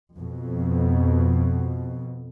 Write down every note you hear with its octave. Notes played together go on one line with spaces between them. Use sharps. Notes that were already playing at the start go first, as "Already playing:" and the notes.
F2 B2